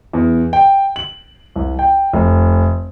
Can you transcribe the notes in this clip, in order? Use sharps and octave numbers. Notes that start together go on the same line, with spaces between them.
E2
G5
F#7
C2
G5
F1